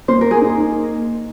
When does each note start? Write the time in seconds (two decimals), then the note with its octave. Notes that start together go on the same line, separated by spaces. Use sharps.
0.08 A#3 C5
0.21 A#4
0.31 G#4
0.41 D#4